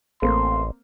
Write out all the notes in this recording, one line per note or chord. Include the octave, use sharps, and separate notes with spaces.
A1 A3 A#3 C4 C6